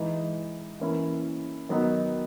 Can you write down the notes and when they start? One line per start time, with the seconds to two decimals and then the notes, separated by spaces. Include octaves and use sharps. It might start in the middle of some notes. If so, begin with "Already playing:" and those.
Already playing: E3 G#3 D#4
0.80 E3 A#3 C#4 E4
1.69 D#3 F#3 B3 D#4